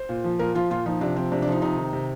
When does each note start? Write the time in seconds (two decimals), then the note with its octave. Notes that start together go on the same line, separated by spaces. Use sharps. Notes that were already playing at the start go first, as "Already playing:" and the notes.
Already playing: C5
0.09 A#2
0.24 F3
0.39 A#2 A#4
0.55 F3 F4
0.70 A#2 F4
0.86 F3 D#4
1.01 C3 D4
1.16 F3 C4
1.32 C3 D4
1.42 D4
1.47 F3 D#4
1.62 C3 D#4
1.77 D#3
1.93 C3